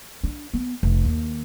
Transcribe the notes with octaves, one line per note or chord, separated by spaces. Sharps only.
D4
B3
F1
D#2